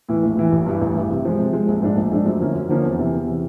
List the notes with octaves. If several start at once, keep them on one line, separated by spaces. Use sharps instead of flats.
A2 E3
A#1
A2 E3
A1
G2 E3
A1
G2 E3
C3
F3 G#3
C3
F3 G#3
A#1
G#2 F3 A3 D4
A#1
G#2 F3 A3 D4
F#2
D3 F3 A#3 C#4
F#2
D3 F3 A#3 C#4
E2
C3 E3
E2
C3 E3